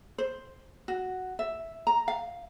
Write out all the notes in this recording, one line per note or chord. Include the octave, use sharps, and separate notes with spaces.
C5
F#4
E5
A#5
F5